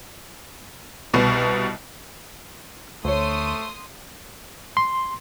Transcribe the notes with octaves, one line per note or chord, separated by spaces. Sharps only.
C2 B2
D2 A3 C5 C#5 C6 D#6
C6